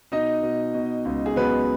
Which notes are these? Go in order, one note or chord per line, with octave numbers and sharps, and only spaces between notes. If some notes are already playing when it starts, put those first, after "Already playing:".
B2 D#4 D#5
B2
B2
C#2
G#4
F#3 B3 B4